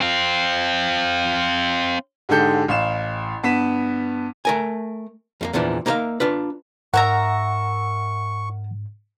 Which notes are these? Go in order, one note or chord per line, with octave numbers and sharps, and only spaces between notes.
C4 F4
G#2 D3 G#3 G4 A4 G6
A1 F5 E7
G2 B3 B6 E7
A3 A#4 G#5
F2 G#3 A#3
E2 A#2 E3 F3 D4
A#3 D#4 A#4 B4 E5 F5
D4 F4 B4
G#2 A#4 E5 F#5 A#5 C#6